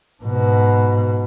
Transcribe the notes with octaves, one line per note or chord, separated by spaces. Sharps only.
G#2 B2